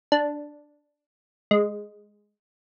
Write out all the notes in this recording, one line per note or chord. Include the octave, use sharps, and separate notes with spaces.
D4
G#3